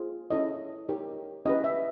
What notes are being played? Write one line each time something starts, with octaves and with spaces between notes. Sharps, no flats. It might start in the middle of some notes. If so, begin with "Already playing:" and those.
Already playing: F4 G#4 C5
C#4 E4 A4 C#5 D#5
D#4 G4 A#4 C#5
C#4 E4 G4 B4 D#5
E5